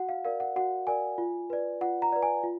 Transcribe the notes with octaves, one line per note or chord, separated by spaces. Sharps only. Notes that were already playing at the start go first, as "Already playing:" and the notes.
Already playing: F#4 F#5
F5
A#4 D5 F5
F#5
F#4 F#5
A#4 D5 G#5
F4
B4 D5
F4 F#5
A#5
B4 D5
G#5
F4